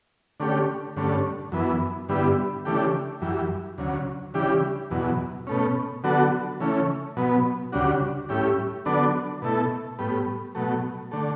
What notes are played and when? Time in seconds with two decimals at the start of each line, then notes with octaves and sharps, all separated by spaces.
0.40 D3 A3 C#4 G4
0.97 G2 D3 A3 C#4
1.52 F#2 E3 B3
2.09 G2 D3 G3 B3 E4
2.65 C#3 E3 A3 D4 G4
3.22 F#2 E3 G3
3.78 D2 C#3 F#3
4.34 C#3 E3 G3 D4 G4
4.91 E2 B2 F#3
5.47 B2 A3 C#4
6.04 D3 F#3 B3 F#4 A4
6.60 C#3 E3 A3 C#4
7.17 B2 F#3 B3
7.72 D2 C#3 G3 D4 F#4
8.29 A2 G3 C#4 E4 G4
8.85 D3 F#3 B3 D4 A4
9.42 B2 A3 E4 A4
9.99 A2 G3 B3
10.55 B2 F#3 A3
11.11 D3 A3